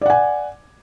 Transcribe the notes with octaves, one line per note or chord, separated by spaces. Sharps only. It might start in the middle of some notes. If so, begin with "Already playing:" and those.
D5 F#5 G#5